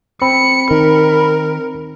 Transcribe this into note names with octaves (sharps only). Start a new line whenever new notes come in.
C4 B5 C#7
D#3 A#4